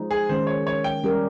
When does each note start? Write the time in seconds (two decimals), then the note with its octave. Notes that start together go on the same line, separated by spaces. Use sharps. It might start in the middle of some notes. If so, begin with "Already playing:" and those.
Already playing: F3 G#3 D#4
0.11 G#4
0.29 D#3 G#3 C#4 C5
0.47 C#5
0.67 C#5
0.84 G5
1.04 G3 C#4 G4 A#4